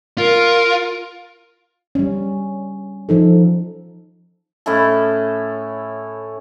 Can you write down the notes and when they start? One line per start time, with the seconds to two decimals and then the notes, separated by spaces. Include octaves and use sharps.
0.18 F4 A#4
1.95 G3 C#4
3.09 F3 D#4 A4
4.66 A2 C#4 E4 A4